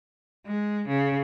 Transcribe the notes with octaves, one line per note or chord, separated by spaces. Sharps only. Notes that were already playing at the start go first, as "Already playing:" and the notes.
G#3
C#3